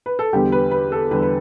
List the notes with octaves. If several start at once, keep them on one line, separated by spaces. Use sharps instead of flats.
B4
A4
E2 D3 G3 G4
B4
B4
A4
E2 D3 G3 B4
B4